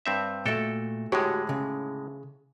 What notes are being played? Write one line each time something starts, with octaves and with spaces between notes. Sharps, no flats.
G2 C4 E5
A#2 A3 F#4 A4 G5
A2 D3 G#3 F#4 G4 C#5
C#3